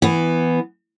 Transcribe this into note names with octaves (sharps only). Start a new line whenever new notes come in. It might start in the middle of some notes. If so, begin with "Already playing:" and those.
E3 B3